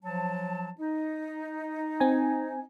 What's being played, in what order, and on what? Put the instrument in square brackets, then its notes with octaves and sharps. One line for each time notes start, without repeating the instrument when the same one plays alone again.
[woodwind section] F3 F#3 A5
D#4
[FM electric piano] C4 G#5